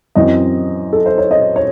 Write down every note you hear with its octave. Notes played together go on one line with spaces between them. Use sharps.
F#2 E3 C4 D#5
A4
C5
C#5
D#5
C#5